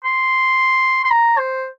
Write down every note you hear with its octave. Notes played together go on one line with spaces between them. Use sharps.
C6
C6
A#5
C5